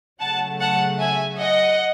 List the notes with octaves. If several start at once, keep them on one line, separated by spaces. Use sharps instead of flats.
C#3 F#3 A3 F#5 A5
F#5 A5
E5 G#5
D#5 F#5